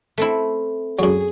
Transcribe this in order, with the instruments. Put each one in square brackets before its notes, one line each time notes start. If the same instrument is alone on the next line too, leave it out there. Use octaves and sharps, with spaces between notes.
[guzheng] A3 C4 E4
[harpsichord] F#2 F#3 [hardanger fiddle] G#4